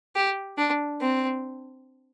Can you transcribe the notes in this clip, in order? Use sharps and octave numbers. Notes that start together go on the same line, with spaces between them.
G4
D4
C4